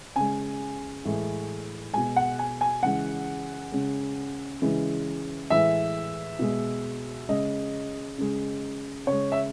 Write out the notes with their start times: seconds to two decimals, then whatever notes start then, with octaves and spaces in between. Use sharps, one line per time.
0.16 C#3 G#3 G#5
1.05 A2 E3 G#3
1.94 B2 G#3 G#5
2.16 F#5
2.39 G#5
2.61 G#5
2.83 C#3 E3 G#3 F#5
3.72 C#3 G#3
4.62 C#3 E3 G#3
5.50 A2 E3 G#3 E5
6.39 B2 G#3
7.29 C#3 G#3 D#5
8.18 C#3 G#3
9.07 C#3 C#5
9.12 G#3
9.32 E5